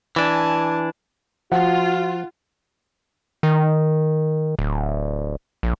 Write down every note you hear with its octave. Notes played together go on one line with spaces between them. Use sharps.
E3 D4 G#5 A5
F3 F4 F#4 F#5
D#3
D1
A#1